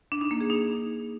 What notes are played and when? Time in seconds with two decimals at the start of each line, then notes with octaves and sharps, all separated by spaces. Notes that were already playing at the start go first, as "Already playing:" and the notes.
0.12 D4
0.21 D#4
0.31 A#3
0.40 G#4
0.50 D#4